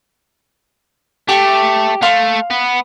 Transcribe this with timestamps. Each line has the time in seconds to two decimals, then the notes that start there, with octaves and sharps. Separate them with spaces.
1.29 A3 G4
2.02 A3 F5 C6
2.50 B3